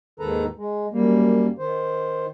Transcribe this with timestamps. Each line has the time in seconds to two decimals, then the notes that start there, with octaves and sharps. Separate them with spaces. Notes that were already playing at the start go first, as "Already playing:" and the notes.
0.20 D#2 G#2 D#3 A4 B4 A#5
0.58 G#3
0.92 F#2 G3 A#3
1.58 D#3 C5